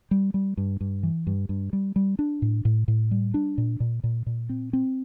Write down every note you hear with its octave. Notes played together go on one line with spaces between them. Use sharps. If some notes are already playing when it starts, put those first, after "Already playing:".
G3
G3
G2
G2
E3
G2
G2
G3
G3
D4
A2
A2
A2
G3
D4
A#2
A#2
A#2
A#2
C4
C4